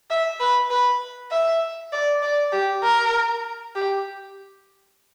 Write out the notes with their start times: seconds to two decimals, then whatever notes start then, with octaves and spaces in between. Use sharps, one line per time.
0.10 E5
0.40 B4
0.70 B4
1.31 E5
1.92 D5
2.22 D5
2.53 G4
2.83 A#4
3.75 G4